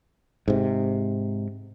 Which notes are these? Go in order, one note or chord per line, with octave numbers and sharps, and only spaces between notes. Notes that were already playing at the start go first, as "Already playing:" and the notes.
G#2 C3